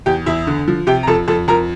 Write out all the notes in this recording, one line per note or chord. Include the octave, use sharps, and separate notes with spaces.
E2 G4 G5
E2 E4 E5
D3
F3
C3 G4 G5
A#5
F2 A4 A5
F2 A4 A5
F2 A#4 A#5